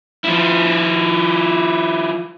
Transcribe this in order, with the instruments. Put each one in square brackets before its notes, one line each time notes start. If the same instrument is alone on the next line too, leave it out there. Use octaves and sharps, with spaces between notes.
[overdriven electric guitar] F3 E4